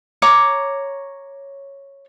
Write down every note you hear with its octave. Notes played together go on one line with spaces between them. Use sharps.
C#5 A#5 D6